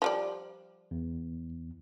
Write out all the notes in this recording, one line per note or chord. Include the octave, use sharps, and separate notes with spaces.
F3 G3 D5
E2